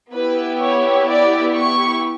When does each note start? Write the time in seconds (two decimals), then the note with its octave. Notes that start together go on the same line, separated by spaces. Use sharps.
0.12 B3 E4 G4 B4
0.60 C#5
1.08 D5
1.56 C#6